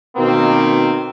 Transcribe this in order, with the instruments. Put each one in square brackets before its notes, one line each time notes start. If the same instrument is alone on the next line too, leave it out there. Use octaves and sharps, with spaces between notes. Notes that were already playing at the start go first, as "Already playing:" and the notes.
[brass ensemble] B2 D#3 A#3 C4